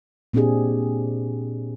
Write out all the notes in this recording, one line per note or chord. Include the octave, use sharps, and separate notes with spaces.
A#2 C4 D4 G4 G#4